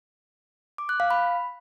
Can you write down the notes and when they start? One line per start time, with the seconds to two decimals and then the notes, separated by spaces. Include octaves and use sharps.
0.78 D6
0.89 F#6
1.00 F5
1.10 B5